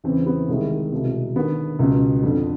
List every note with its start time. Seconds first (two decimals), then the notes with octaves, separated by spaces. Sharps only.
0.04 E2 C#3 E3 C4
0.26 B3
0.49 C2 C3 D#3 G#3
0.92 C2 B2
1.36 D#2 D3 B3
1.79 C#2 B2
2.23 F2 D3